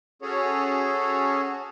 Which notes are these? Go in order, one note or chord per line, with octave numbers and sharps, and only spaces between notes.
C#4 F#4 G#4 A4 C#5